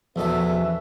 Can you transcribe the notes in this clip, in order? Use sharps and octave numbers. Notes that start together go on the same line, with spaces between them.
E2 B2 F3 C#4 A4 B4 E5